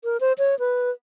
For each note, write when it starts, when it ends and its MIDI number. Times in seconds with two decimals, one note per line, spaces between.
0.04 0.20 70
0.21 0.33 72
0.38 0.58 73
0.59 0.90 71